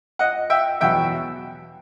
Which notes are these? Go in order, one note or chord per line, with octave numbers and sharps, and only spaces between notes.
D#5 F#5
E5 G5
E2 B2 F#3 B3 E5 G5